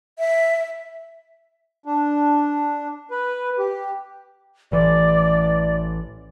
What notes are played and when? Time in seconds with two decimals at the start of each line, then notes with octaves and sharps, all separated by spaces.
0.18 E5
1.85 D4
3.11 B4
3.59 G4
4.72 A1 E3 D5